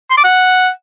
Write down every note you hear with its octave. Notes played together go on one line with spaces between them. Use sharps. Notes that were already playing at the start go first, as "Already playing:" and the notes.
C6
D6
F#5